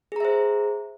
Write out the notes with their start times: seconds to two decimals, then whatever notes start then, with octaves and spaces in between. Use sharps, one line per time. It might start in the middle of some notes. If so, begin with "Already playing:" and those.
0.12 G#4
0.16 A#5
0.20 E5
0.25 C5